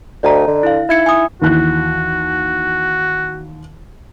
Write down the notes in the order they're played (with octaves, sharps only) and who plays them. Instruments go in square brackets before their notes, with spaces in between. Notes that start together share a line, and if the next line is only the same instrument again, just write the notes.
[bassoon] D2 [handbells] D5 D#5 A#5
[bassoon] D3
[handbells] E4 F5
[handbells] D#4 G#6 C#7 [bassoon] E4
[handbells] G#5 D#6
[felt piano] D#2 E3 F#6 [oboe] F#4